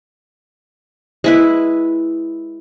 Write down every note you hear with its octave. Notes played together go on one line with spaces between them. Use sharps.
G#3 E4 B4